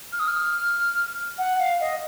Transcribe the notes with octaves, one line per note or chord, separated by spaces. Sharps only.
F6
D#6
F6
F#5
F5
D#5